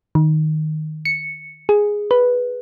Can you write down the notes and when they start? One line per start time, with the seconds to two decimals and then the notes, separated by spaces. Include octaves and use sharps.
0.15 D#3
1.05 C#7
1.69 G#4
2.11 B4